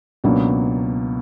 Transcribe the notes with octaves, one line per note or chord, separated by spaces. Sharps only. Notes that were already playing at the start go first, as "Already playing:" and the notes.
C#2 B2 F#3 A#3 D4